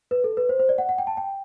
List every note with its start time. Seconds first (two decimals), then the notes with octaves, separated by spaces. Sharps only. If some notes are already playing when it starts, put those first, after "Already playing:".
0.11 B4
0.24 A4
0.37 B4
0.49 C5
0.59 C5
0.69 D5
0.78 F#5
0.89 F#5
0.98 G5
1.07 A5
1.17 G5